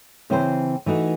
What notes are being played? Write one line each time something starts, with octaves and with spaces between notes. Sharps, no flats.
C#3 E3 C4 E4 C5
E3 A3 D#4 F#4